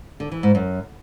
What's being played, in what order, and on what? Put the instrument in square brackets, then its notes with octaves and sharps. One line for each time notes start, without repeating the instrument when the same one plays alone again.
[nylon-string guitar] D3
E3
G#2
F#2